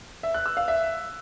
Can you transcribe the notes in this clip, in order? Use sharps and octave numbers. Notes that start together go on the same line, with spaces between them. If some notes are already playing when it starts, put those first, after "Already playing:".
E5
F#6
E6
F5
E5